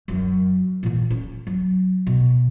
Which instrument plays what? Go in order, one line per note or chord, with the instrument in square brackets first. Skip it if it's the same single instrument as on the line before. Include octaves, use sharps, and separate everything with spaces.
[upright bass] F#2 D#3
A#2 E3
C#4
F#3
B2